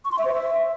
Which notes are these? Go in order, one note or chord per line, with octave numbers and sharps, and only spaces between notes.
C#6
C6
E5
C5
E5